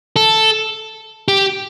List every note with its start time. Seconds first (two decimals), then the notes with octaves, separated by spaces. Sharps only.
0.16 A4
1.28 G4